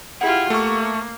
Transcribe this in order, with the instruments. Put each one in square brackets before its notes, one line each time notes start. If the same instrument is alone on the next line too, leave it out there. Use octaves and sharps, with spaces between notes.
[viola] E4 F4 [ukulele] G4 G#4 F#5
[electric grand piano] A3 C#6 [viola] A#3